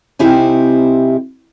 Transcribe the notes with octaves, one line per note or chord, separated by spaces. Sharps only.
C3 C4 D#4 E4 G4 G#5